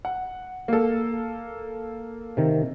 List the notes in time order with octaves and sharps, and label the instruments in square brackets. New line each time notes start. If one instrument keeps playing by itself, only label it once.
[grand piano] F#5
A#3 A4
[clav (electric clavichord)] C3 D#3